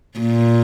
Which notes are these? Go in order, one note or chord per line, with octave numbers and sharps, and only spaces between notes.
A#2